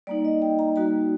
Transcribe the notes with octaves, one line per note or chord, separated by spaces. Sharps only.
G3 A#3 D#4 D5
D#5
G5
A#5
G3 A#3 D#4 F#4 A#5